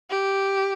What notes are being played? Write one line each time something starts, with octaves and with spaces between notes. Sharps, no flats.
G4